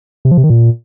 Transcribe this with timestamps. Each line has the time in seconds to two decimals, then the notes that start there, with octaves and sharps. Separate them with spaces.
0.25 C3
0.31 F3
0.37 C3
0.44 D#3
0.50 A#2